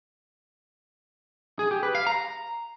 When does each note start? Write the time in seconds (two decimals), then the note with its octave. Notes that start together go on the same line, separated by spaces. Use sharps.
1.59 G#4
1.71 G4
1.83 B4
1.95 F5
2.07 A#5